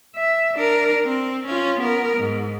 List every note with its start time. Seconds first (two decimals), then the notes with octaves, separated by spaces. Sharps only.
0.16 E5
0.55 D4 A#4
1.05 C4
1.47 C#4 F4
1.80 B3 A#4
2.17 G#2